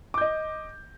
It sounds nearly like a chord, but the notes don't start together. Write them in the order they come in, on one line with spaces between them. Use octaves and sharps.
D6 G6 D#5